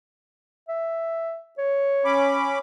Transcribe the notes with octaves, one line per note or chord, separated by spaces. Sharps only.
E5
C#5
C#4 B5 D6